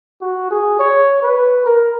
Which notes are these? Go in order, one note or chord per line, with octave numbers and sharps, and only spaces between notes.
F#4
G#4
C#5
B4
A#4